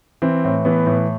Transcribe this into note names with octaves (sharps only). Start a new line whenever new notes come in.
E3 C4
A2
E3 B3
A2